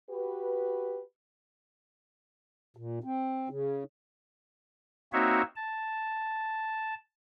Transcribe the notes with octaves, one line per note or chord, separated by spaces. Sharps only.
F#4 G4 B4
A#2
C4
C#3
A#3 C4 D#4 F#4 C#5 E5
A5